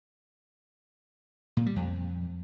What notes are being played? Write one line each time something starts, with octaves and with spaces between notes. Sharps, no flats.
A#2
G3
F2